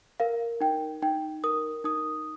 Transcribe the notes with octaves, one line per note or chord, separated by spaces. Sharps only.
A#4 F5
D#4 G5
D#4 G5
A#4 D#6
D#4 D#6